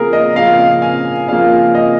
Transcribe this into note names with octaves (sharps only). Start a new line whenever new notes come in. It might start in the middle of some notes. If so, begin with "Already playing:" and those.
Already playing: C#3 F3 A#3 G#4 A#4
D#5
C#3 F3 A#3 F5
G#5
C#3 F3 A#3 F5
D#5